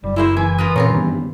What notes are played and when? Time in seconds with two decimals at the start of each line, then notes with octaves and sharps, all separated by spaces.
0.04 F#1 G3
0.16 G#3 A#3 E4 C5
0.37 E3 E4 G#5
0.58 F4 A#4 B4 D#6
0.76 A#2 C#3 C4 F4 A#4 C#5
0.90 G2 D#3 B3